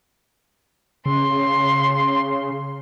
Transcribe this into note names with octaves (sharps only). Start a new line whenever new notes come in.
C#3 C6